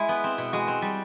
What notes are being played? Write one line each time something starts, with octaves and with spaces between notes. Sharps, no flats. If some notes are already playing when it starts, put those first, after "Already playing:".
Already playing: G#3 E4
B3
C4
B2
G#3 F#4
C4
G3